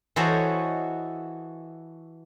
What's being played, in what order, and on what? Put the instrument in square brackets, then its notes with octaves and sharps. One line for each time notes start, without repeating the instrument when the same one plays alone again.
[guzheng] E3 F#4 A4 C5 C#5 D#5